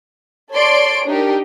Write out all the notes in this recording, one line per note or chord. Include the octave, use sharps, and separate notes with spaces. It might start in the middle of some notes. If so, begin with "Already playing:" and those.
A4 C#5 D5 C6 D7
D4 D#4 G4 A#4